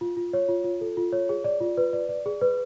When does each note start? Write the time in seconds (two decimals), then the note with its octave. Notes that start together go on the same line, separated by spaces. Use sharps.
0.01 F4
0.17 F4
0.33 C#5
0.48 F4
0.64 F4
0.81 A4
0.97 F4
1.13 C#5
1.29 G#4
1.44 D5
1.60 F4
1.77 B4
1.93 D5
2.09 D5
2.26 G#4
2.41 B4